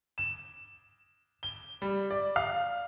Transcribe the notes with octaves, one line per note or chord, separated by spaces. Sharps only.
E7
G7
G3
D5
F5